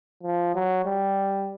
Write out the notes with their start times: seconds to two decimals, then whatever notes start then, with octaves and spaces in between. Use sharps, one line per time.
0.23 F3
0.55 F#3
0.85 G3